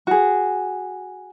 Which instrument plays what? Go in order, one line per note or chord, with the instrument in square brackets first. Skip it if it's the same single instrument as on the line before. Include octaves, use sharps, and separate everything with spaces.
[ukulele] F#4 G#4